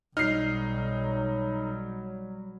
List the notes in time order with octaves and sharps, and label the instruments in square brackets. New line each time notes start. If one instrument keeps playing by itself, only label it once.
[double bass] B1 [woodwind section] F#3 G3 [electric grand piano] D#4 [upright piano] F6 C7